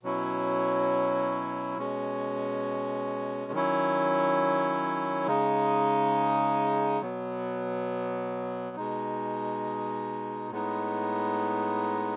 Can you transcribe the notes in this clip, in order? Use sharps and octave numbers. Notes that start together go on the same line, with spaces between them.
B2 F#3 C#4 E4
B2 G#3 C#4
D#3 F#3 C#4 E4
C#3 G#3 D#4
B2 F#3 B3
B2 G#3 D#4
A2 G#3 B3 D#4